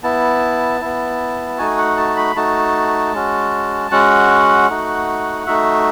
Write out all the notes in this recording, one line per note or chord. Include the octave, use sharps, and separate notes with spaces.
B3 E4 A5
B3 E4
A3 D#4 F#4 G#5
F#5
A5
B5
A3 D#4 F#4 A5
G#3 C#4 F#4
G#3 C#4 F#4 F#5
A3 D#4 F#4
A3 D#4 F#4 E5